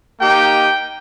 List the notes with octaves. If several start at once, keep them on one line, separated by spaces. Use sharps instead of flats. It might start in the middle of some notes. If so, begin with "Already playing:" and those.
A#3 D#4 G4 G5